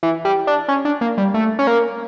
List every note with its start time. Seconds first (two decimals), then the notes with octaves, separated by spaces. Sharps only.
0.03 E3
0.25 G3
0.47 D4
0.68 C#4
0.85 D4
1.01 A#3
1.18 G3
1.34 A3
1.59 C#4
1.67 A#3